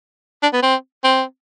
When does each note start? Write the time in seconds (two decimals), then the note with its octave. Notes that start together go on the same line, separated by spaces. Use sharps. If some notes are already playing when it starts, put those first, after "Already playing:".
0.43 D4
0.53 B3
0.63 C4
1.04 C4